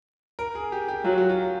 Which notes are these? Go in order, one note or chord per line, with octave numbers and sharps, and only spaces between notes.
A#4
G#4
G4
G4
F#3 F4
F#4
F4